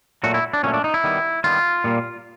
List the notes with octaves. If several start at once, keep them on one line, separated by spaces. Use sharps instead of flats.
A#2 F#3 A3 F#4
E4
D4
A#2 F#3 A3 C#4
D4
D#4
E4
D#3 G3 B3
D#3 G3 B3 F4
A#2 G3 A#3